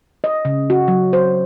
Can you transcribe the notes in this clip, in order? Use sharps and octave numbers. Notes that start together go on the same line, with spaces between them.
D#5
C#3
F#4
F#3
C5